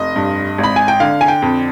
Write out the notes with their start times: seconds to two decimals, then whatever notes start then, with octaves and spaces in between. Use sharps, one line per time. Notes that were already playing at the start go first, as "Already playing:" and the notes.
Already playing: F1 D#5
0.16 G2
0.58 G#1
0.64 B5
0.76 G#5
0.88 G5
1.00 D3 F5
1.21 G#5
1.28 G5
1.42 F2